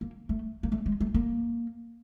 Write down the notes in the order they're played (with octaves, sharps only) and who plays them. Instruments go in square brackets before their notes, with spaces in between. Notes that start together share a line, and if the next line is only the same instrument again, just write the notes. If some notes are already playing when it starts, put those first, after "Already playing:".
[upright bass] A#3
A3
A#3
A3
G#3
A3
A#3